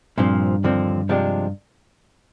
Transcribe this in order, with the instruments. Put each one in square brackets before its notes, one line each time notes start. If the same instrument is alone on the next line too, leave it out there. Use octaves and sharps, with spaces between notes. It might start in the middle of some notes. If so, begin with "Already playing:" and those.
[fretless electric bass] G2 [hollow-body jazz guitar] A#2 F3 C4
[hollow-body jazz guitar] D#2 D3 F3 C4
C3 F3 G#3 D4 G4